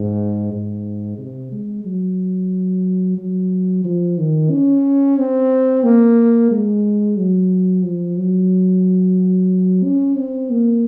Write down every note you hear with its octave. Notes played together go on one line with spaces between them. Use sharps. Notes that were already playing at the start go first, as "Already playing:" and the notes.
Already playing: G#2
G#2
C3
G#3
F#3
F#3
F3
D#3
C#4
C4
A#3
G#3
F#3
F3
F#3
C#4
C4
A#3